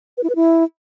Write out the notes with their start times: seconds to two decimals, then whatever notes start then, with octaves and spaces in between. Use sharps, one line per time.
0.17 B4
0.24 E4
0.30 B4
0.36 E4